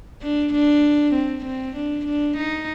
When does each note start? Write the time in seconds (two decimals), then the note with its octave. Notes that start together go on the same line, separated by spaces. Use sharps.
0.23 D4
0.53 D4
1.14 C4
1.45 C4
1.76 D4
2.06 D4
2.37 D#4